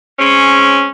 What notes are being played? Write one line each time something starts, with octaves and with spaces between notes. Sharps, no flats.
G#3 C4 C#4